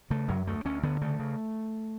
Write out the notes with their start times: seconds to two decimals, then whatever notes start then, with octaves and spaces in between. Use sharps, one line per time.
0.10 C#3 A3
0.29 F#2 F#3
0.47 D2 A3
0.65 D2 C#4
0.83 D3 B3
1.02 C#3 A3
1.19 C#3